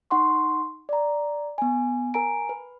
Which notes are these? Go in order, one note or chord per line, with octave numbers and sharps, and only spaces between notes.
D#4 F#5 C6 C#6
D5 A#5
B3 G#5
A#4 G#5 A#5 D7
B4